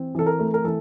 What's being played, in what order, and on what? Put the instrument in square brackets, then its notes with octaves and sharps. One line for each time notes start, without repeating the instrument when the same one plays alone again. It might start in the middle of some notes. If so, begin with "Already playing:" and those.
Already playing: [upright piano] E3 C4
[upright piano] E3 [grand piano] A4
[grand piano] A#4
[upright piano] A3
[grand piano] A#4
[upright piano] E3 [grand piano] A4